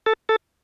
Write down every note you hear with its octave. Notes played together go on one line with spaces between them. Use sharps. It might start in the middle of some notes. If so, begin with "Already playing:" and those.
A4
A4